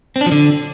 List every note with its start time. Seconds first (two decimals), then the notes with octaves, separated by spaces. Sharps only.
0.16 C4
0.21 D4
0.26 F3
0.32 D3